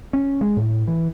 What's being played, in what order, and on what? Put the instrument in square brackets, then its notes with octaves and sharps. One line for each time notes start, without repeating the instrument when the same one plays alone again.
[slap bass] C#4
G#3
A2
E3